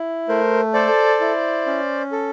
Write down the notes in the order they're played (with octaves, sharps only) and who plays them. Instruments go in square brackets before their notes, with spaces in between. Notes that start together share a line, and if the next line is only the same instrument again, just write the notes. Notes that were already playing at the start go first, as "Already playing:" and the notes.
Already playing: [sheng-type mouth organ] E4
A3 A#4 C5
A4 C5 D5
E4
C#4
A4